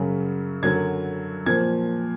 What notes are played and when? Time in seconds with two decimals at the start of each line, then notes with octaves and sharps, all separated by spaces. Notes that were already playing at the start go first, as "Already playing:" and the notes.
Already playing: F#2 C#3 F#3
0.63 F#2 D3 F#3 G#6
1.46 A#2 F3 G#6